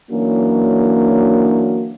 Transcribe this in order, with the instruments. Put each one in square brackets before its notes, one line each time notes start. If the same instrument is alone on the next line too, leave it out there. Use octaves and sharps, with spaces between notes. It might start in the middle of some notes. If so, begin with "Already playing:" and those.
[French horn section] E3 F#3 A#3 C#4 D4 F#4